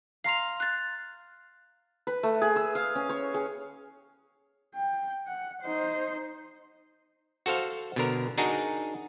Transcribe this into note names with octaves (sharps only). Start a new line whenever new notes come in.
F5 A#5 C6 C7 F7
F#6 A6
B4
A3
G#4
E6
F5
C#4
C#5
G#4
G5
F#5
D#4 C5
F#4 A4 C5 F5
B2 D3 A#4
D4 D#4 F#4 G#4 A#4